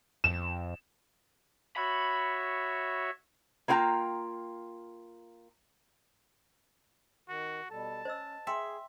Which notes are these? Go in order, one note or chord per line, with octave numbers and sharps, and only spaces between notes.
F2 E7
F#4 C#5 E5 B5
A#3 B3 F4 F#5 G5 A#5
D#3 F#4
B2 G3 A4 A5
C#4 C5 D#5 E6
G#4 E5 G5 G#5 C6